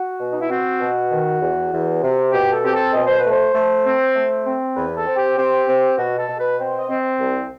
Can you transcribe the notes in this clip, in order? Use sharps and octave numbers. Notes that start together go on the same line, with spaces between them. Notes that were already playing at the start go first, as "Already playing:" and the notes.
Already playing: F#4
B2
D#4
E4
C4 F#4
B2
D#3
E2
E2
C3
B2 G4
A4
C4 G4
A4
B2 D#5
C5
B4
A3
C5
A3
C4
A3
C4
E2 B4
A4
C4
G4
C4 G4
C4
B2 F#4
A4
B2
B4
C4 C5
D#5
C4
C2